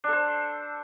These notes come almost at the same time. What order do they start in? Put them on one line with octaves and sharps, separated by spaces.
D4 A4 C5